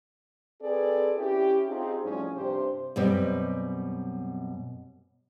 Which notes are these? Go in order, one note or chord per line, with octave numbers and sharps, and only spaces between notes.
C4 G#4 A4 B4 D5
C#4 E4 G4
C4 D#4 F4 G4 G#4
A2 F3 G3 C#4
G2 C3 G4 C5
F#2 B2 G3 C4